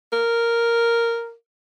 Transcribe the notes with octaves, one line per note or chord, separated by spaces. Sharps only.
A#4